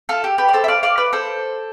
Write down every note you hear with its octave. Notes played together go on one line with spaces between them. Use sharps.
F4 A4
G4
G4 B4
D5
A4 C5
E5
D5 F5
D5 F5
B4 D5
A4 C5